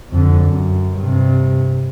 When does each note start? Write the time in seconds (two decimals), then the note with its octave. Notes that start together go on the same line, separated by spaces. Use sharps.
0.12 F2 D3
0.42 F#2
0.99 G2 C3